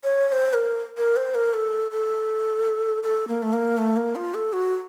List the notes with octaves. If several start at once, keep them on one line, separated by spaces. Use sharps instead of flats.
C#5
C#5
C5
A#4
A#4
C5
A#4
A4
A4
A4
A#3
A3
A#3
A3
A#3
F4
A4
F#4